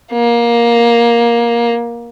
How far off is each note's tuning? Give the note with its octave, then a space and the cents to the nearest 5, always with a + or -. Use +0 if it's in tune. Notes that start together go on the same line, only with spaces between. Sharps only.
A#3 +15